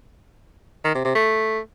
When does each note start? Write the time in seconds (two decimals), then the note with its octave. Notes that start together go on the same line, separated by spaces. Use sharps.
0.85 D#3
0.95 C3
1.05 C3
1.15 A3